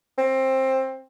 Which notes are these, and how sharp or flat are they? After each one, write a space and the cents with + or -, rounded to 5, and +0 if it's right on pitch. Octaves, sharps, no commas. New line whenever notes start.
C4 +15